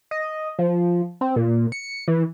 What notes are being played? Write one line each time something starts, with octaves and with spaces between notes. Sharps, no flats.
D#5
F3
C4
A#2
C#7
E3